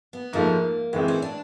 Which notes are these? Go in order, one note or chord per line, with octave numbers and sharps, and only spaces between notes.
B3
G#2 F3 A3 A#3
A2 E3 G#3 B3 C4
C#4
D4